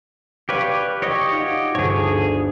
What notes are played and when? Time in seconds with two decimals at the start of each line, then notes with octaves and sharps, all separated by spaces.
0.49 G4 B4 C#5 D5 F5 D6
1.02 G4 C#5 D#5
1.31 D#4 F4 F#4
1.75 G1 D2 G#4 A4 C#5